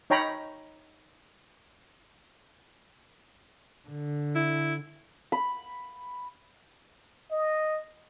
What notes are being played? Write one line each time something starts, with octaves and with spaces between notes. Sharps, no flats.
D#4 C#5 G5 A#5 B5
D3
E4
B5
D#5